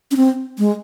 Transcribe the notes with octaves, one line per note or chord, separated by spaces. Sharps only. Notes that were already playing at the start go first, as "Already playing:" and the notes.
C#4
C4
G#3